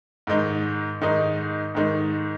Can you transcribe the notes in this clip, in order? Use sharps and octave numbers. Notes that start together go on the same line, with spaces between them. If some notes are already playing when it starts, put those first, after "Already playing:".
G#2 D#3 G#3 D#4
G#2 D#3 G#3 D#4
G#2 D#3 G#3 D#4